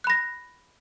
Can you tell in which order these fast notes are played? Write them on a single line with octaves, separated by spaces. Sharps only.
F#6 B5 A#6